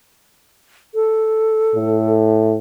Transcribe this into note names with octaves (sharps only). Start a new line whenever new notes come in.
A4
A2